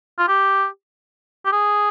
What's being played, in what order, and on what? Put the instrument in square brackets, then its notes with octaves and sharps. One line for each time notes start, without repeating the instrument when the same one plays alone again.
[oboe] F4
G4
G4
G#4